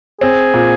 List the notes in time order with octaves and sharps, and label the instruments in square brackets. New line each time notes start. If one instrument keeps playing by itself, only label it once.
[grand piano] C4 [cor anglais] G#4
[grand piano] A#2